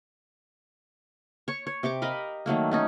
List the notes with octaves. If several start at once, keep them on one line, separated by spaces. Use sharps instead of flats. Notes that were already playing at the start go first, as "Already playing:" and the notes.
C#5 C#6
C#5
C3 G4 C#6 D6
A#4 D#5 F5 B5
D#3 F#3 A3 A#3
A3 C#4 D#4